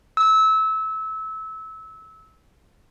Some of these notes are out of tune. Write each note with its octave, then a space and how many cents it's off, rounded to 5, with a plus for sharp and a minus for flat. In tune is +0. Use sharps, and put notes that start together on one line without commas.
E6 -25